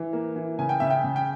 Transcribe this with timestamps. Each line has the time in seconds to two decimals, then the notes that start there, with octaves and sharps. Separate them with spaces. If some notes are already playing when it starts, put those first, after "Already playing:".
Already playing: E3
0.13 A#3
0.36 E3
0.59 C#3 G#5
0.69 G5
0.80 C#3 E5
0.90 G5
1.04 C#3
1.16 G5